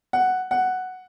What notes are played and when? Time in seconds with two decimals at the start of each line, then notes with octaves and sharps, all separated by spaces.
0.13 F#5
0.51 F#5